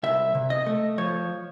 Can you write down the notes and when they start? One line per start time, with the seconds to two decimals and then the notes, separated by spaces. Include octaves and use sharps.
0.03 C2 E5
0.35 C3
0.50 D#5
0.66 A3
0.98 F3 C#5